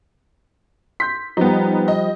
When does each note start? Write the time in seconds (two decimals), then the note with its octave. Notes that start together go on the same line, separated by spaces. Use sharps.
1.00 C6 G6 B6
1.37 F3 G3 B3 D#4
1.88 D#5